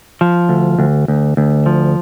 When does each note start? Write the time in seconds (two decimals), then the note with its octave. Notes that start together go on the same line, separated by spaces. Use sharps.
0.21 F3
0.49 D2
0.79 D2
1.08 D2
1.37 D2
1.66 F3